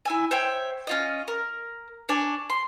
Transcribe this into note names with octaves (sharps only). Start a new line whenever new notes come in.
E4 E5 G#5
C5 C#5 E5 G5
C#4 F4 D#5
A#4
D4 C#5 D5 G#5
C6